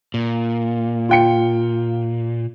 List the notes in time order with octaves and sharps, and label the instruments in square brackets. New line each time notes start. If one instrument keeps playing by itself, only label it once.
[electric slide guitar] A#2
[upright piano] F4 G5 C#7